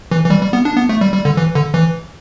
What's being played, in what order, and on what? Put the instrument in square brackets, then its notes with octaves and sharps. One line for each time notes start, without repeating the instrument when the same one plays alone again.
[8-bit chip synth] E3
E3
G3
G3
B3
D4
B3
A3
G3
G3
D3
E3
D3
E3